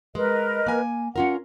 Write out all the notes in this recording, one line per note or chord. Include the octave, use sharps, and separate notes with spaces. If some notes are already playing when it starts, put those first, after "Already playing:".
G#3 A#4 B4 D#5
A#3 G#5
C#4 F4 A#4 F#5